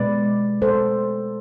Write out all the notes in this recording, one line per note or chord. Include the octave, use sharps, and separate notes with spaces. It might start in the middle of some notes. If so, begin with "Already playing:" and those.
Already playing: B2 G#3 B4 D5
A4 C5